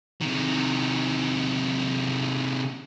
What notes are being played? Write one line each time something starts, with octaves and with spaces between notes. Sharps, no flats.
C3 D#3